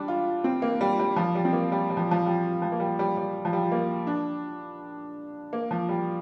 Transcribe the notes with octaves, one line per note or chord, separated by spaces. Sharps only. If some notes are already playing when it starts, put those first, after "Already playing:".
Already playing: G3 D4
F4
C4
A#3
G3
G3
F3
G3
C4
A#3
G3
G3
F3
F3
G3
F3
A#3
G3
G3
G3
F3
G3
A#3
D4
A#3
F3
G3